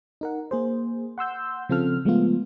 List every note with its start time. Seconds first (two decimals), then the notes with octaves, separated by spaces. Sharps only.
0.21 D#4 A#4 F#5
0.51 A#3 G#4 C5
1.18 F#5 C6 E6 G6
1.69 C#3 F3 C4 F4 A4 F6
2.05 F3 G#3 A3 B3 F4